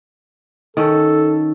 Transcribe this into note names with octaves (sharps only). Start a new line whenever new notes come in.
D#3 C#4 A4